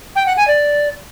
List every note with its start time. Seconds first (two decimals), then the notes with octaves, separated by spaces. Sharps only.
0.15 G5
0.26 F#5
0.37 G#5
0.47 D5